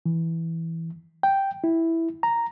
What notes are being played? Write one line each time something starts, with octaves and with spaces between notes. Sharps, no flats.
E3
G5
E4
A#5